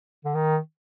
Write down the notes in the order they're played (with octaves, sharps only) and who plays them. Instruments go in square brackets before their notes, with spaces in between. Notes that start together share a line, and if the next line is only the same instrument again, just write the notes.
[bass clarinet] D3
D#3